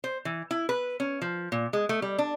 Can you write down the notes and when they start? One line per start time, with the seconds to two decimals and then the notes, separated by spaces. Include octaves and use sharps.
0.04 C5
0.25 E3
0.51 E4
0.69 B4
1.00 C#4
1.22 F3
1.52 A#2
1.73 G#3
1.89 A3
2.02 G3
2.18 D4